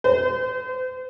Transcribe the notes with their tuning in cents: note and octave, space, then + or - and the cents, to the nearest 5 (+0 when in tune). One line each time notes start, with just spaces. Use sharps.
C5 -40